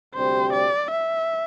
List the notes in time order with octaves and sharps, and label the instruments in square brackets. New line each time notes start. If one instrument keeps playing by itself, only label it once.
[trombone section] D2 C3 G3 C4 G4 [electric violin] C5
[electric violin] D5
E5